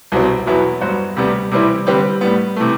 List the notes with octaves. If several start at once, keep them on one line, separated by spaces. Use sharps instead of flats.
C2 B2 F#3 C4
E2 B2 F#3 B3 E4
G2 F#3 B3 F#4 C5
D2 C3 G3 B3
C3 E3 G3 C4 E4
D3 G3 C4 G4 B4
A2 G3 B3
C3 E3 A3